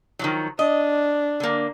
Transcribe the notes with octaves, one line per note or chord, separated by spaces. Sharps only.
D#3 F3 F#3
D4 D#5
D3 A#3